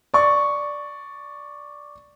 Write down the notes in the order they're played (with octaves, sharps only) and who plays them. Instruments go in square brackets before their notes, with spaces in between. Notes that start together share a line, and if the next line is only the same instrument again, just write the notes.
[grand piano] D5 C#6